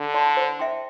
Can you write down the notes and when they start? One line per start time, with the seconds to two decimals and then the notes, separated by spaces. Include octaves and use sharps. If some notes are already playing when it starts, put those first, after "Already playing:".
Already playing: D3
0.14 D5 A5 C6
0.37 C5
0.59 E5 G5 C6